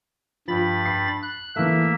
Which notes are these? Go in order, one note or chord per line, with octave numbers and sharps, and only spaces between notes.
G2 F3 B5 A6
C7
F#6
E3 A3 A#3 E5